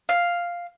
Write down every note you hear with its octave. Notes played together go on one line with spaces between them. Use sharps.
F5